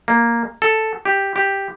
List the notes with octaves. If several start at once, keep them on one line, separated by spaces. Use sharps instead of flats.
A#3
A4
G4
G4